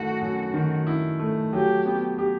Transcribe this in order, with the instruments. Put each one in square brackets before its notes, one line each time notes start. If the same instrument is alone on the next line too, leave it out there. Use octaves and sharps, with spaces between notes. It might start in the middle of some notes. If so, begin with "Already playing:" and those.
Already playing: [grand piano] F#2 D#3 A3 E4 [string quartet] F#4
[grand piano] F#2
D#3
E4
A3
[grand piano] F#3 [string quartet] G4
[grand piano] B3
G4